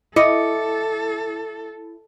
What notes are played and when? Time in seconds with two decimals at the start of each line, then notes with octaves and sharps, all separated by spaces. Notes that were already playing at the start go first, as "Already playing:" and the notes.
0.16 E4 A4 D#5 E5 D6 C#7